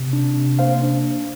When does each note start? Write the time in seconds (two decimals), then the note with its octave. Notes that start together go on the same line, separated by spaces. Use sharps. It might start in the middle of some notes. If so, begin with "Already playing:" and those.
Already playing: C3
0.13 D4
0.37 C3
0.59 A#3 C5 F5
0.83 D4